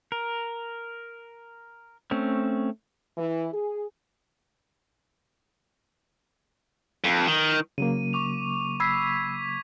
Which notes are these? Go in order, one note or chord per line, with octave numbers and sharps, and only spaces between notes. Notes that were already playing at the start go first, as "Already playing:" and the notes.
A#4
A3 C4 C#4
E3
G#4
F2
D#3
C#3 F#3 A#3 D#7
C#6 D6 F7
B5 E6 G#6 B6 C7